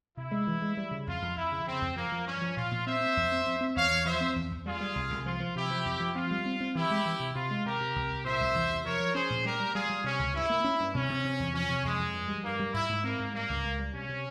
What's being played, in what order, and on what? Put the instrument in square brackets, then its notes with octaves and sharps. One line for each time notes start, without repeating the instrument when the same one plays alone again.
[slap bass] C3 [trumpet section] E4
[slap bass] G#3
E3
G#3
G3
C#3
[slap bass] F2 [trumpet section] F4
[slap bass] F2
[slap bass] F2 [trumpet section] E4
[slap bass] C#3
[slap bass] C#3 [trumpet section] C4
[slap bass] F2
[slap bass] F3 [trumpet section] A#3
[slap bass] F3
[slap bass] G2 [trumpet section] C#4
[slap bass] F3
[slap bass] A#2 [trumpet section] F4
[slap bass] A#2
[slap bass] C4 [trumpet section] C5 E5
[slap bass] C4
F2
C4
C4
C4
[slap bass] E2 [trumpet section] C#5 F5
[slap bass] E2
[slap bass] F3 [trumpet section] C5 E5
[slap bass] C4
E2
E2
[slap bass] G3 [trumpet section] F4 G#4
[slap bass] G3
C2
C2
[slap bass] F3 [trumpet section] F4
[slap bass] F3
[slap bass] C3 [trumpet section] E4 G4
[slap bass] F3
F2
F3
[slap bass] C4 [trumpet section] F4
[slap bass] G3
C4
C4
[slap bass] E3 [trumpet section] E4 G4
[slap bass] G#3
E3
C3
[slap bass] C3 [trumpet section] F4
[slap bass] G#3
[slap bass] C3 [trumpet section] G4 A#4
[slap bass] C3
C2
C2
[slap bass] A#2 [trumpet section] C5 E5
[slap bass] C2
E2
C3
[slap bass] F3 [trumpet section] A#4 C#5
[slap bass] F3
[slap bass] C#4 [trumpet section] G#4 C5
[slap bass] A#2
[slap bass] G3 [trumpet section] G4 A#4
[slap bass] G3
[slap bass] G3 [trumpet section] F4 G#4
[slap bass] G3
[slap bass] C3 [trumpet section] C#4
[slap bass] C#2
[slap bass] G2 [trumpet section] E4
[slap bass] A#3
C#4
G2
[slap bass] C3 [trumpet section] C#4
[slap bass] C3
C3
E2
[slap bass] F3 [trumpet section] C#4
[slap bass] C3
[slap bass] F2 [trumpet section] G#3
[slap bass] F2
G2
G3
[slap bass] G2 [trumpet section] A#3
[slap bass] G3
[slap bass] G#2 [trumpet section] E4
[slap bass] G#2
[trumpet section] A#3 [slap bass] C4
[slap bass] G#2
[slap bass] G3 [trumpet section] A#3
[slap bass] C#2
C#2
G3
[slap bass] C3 [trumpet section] C#4
[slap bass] C3